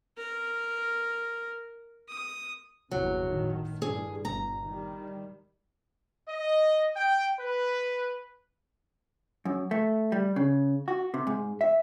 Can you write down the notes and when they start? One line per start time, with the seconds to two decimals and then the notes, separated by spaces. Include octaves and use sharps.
0.18 A#4
2.09 D#6
2.91 G1 E2 C3 F#3
3.25 A2 D#3
3.82 G2 A#2 G#4
4.25 G1 A#5
4.62 D#3 G3
6.29 D#5
6.97 G5
7.39 B4
9.45 F#2
9.71 A3
10.12 G3
10.36 C#3
10.88 F#4
11.14 C3
11.27 G#2
11.61 E5